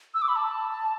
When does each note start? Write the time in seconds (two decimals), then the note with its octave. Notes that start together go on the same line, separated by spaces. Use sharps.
0.14 E6
0.22 D6
0.28 B5
0.36 A5